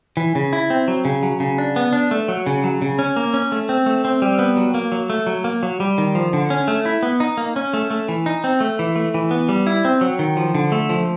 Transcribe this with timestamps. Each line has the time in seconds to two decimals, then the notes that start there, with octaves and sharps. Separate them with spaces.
0.17 E3
0.35 C#3
0.53 E4
0.70 C4
0.88 F#3
1.05 C#3
1.23 F#3
1.40 C#3
1.58 D4
1.76 B3
1.93 D4
2.11 A3
2.28 F#3
2.46 C#3
2.64 F#3
2.82 C#3
2.99 C#4
3.16 A#3
3.34 C#4
3.52 A3
3.69 C4
3.86 A3
4.05 C4
4.22 G3
4.39 B3
4.57 F#3
4.74 A#3
4.92 F#3
5.10 A3
5.27 F#3
5.44 A#3
5.63 F#3
5.80 G3
5.98 D#3
6.15 F3
6.33 D3
6.50 C#4
6.68 A3
6.86 E4
7.03 B3
7.20 D#4
7.37 A#3
7.56 C#4
7.73 A3
7.90 A3
8.09 E3
8.26 D#4
8.44 C4
8.60 A3
8.79 E3
8.96 A3
9.14 E3
9.31 B3
9.49 G3
9.67 E4
9.85 C4
10.01 F#3
10.19 D#3
10.37 F3
10.55 D3
10.72 A3
10.89 F3